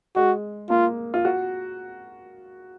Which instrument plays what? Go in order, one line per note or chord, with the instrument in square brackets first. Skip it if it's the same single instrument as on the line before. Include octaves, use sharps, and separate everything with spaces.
[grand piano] G#3 [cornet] F#4
[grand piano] A#3 [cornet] F4
[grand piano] F4
F#4